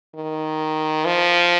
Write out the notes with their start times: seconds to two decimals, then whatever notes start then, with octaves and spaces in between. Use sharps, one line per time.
0.16 D#3
1.05 F3